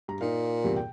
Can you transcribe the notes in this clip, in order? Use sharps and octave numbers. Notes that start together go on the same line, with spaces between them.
G2 A#5
A#2 D#4 F5
E2 G2 C3
G5